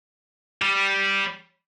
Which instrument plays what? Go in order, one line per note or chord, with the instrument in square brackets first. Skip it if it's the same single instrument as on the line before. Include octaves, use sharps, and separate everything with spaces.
[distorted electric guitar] G3